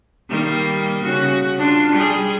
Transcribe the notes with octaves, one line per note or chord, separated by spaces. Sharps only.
D#3 G3 A#3
C#3 F#4
D4 F4
G3 G#4